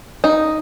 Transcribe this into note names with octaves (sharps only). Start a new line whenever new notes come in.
D#4